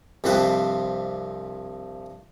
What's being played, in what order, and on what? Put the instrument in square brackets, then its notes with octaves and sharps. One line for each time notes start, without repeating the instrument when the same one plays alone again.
[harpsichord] C2 G2 F3 C4 B4 C5